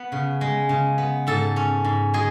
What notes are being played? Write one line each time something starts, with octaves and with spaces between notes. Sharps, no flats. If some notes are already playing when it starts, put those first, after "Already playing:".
Already playing: B3 B4
C#3
G#3
C#3
B3
G#2 A4
C#4
G#2
G#3 G#4